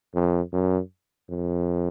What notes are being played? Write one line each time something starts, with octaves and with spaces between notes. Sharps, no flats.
F2
F#2
F2